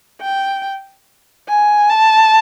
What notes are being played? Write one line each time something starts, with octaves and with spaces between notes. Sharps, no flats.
G5
G#5
A5